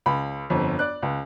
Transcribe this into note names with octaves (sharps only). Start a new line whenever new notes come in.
C#2 B5
G1 F2
D5 F#6
C#2